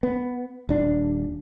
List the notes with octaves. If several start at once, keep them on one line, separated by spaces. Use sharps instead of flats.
B3
D#1 D4